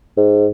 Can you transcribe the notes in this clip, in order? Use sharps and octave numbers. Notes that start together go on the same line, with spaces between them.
G#2